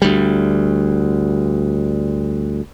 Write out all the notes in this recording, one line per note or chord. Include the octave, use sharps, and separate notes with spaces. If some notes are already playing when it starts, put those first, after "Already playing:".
D2 G3